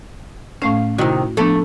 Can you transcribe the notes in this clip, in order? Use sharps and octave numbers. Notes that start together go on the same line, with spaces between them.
A2 A3 C#4 F5
C3 D#3 E4 F#4
F3 A3 B3 D4